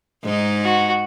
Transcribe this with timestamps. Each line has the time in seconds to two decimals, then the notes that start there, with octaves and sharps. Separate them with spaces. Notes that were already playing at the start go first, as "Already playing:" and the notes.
0.24 G#2 D#4
0.64 F#4